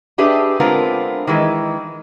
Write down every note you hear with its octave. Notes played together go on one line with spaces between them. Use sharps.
D4 G4 G#4 B4 E5
D3 G#3 B3 C4 F4 A#4
D#3 E3 G#3